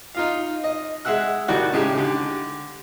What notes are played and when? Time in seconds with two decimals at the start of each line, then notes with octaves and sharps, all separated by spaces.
0.15 D#4 F4 F5
0.64 D#5
1.05 G#3 E5 F#5 E6 F#6
1.48 A2 D#3 G3 F#4 D5 F#6
1.73 A2 C#3 G#3 D#4 G4
1.97 D3 G4